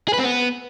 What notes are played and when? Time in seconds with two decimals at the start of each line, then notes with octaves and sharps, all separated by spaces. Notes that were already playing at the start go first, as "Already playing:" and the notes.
0.08 G#4
0.14 B4
0.19 C4
0.24 B3